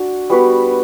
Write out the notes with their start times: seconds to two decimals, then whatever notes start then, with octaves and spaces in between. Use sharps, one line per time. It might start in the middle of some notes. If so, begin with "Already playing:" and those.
Already playing: D4 F#4
0.30 G3 B3 F#4 B4